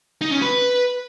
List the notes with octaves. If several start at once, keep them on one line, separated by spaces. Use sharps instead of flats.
D#4
C#4
B4